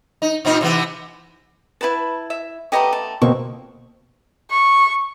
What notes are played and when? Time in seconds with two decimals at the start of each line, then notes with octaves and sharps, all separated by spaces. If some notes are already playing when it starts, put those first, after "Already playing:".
0.22 D#4
0.45 A#2 C4 D#4
0.61 C3 E3 B3
1.81 B3 E4 B4 A5
2.30 E5
2.72 A3 B3 C#4 G4 D#5 A#5
2.93 A5
3.22 B2 G3 A#3 C4 C#6
4.51 C#6